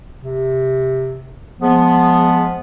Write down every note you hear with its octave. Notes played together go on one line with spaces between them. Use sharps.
C3
F3 G#3 B3